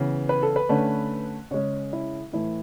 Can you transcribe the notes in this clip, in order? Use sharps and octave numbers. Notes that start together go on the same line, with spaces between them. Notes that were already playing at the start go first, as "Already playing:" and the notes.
Already playing: C#3 E3 B3
B4
A4
B4
D3 A3 C#4
C#3 G#3 C#4 C#5
E4
A2 E3 A3 E4